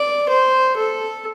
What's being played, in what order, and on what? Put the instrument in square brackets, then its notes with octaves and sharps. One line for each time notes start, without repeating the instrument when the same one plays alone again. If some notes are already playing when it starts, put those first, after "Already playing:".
Already playing: [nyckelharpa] D5
C5
A4